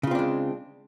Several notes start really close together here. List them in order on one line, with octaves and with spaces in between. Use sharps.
C#3 F4 C4 D4 G#3